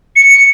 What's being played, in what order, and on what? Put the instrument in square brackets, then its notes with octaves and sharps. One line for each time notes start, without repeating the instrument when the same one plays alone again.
[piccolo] C#7